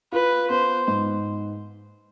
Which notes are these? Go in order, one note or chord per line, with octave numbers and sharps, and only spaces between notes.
F4 B4
B3 C5
G#2